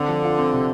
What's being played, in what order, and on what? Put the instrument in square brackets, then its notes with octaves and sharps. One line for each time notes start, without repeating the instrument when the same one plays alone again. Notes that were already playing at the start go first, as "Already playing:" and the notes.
Already playing: [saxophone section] D3 [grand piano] C4
[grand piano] F3
F4
C4
C3